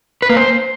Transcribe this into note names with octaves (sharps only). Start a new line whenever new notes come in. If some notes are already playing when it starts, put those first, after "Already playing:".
B4
A#3
C5